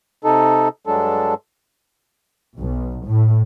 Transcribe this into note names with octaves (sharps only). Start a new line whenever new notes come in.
C3 D#4 A4
G2 F#3 G#3 D4 A4
B1
A2